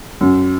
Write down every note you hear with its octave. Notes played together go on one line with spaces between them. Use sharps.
F#2